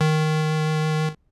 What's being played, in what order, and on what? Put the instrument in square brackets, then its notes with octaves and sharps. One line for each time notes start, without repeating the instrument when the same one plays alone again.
[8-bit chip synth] D#3